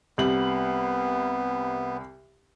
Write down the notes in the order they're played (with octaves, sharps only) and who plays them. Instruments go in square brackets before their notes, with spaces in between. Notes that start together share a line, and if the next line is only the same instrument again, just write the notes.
[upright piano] C2 G3 F#7 [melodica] B3